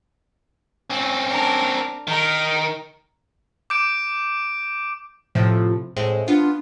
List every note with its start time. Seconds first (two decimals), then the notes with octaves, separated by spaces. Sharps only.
0.90 C4 C#4
1.29 D4 A#4
2.07 D#3 A#4
3.70 D6 G6 D7
5.35 A2 C3 F3
5.96 A2 G#3 C4
6.28 B3 D4 F4